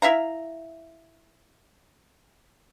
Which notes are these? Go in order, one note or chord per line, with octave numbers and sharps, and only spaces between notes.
E4 E5 F5 A#5